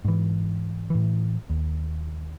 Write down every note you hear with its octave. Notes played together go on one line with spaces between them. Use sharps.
G#2 E3
A2 E3
D#2